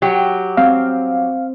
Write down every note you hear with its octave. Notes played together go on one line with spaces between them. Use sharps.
F#3 G4
C4 F5